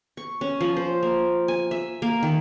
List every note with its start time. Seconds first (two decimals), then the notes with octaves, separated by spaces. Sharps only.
0.17 C#6
0.41 C#4
0.61 F3
0.77 C5
1.03 A#3
1.48 G#5
1.71 E5
2.02 A#3
2.23 D#3